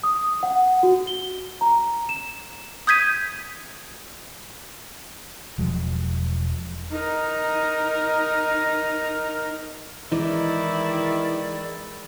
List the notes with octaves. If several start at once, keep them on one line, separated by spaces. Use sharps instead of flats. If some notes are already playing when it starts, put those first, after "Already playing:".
D#6
F#5
F#4
G7
A#5
E7
D#6 G6 G#6 B6 D#7
E1 F3 F#3 G#3
D#4 A#4
D#3 E3 G#3 D#4 E4 D5